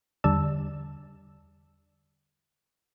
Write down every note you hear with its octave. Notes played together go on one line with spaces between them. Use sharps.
E2 D3 G3 D5 A5 E6